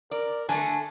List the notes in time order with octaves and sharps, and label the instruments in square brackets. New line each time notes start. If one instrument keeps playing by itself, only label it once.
[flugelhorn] A#4 [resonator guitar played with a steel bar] D5
[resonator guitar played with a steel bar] D3 A3 [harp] G#5 [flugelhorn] A5